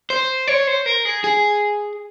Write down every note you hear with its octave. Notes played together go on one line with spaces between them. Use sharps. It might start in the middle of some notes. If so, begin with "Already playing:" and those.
C5
C#5
C5
A#4
G#4
G#4